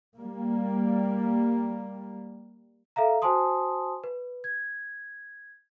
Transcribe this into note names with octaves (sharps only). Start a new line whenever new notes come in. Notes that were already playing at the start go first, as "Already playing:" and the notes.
G3 A#3
A4 E5 F5 A#5
F#4 C5 G#5 A5 C6 D#6
B4
G#6